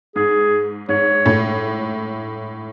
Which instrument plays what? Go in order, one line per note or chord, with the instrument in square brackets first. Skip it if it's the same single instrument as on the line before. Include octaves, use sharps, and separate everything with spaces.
[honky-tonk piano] G#2 [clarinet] G#4
[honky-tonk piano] G#2 [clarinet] C#5
[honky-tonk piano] A2